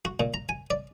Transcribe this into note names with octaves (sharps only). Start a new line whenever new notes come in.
F#4
A#2
A#5
G#5
D5